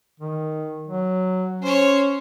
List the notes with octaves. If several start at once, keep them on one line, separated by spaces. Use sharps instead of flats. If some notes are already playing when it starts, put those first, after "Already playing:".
D#3
F#3
C#4 C5 C#5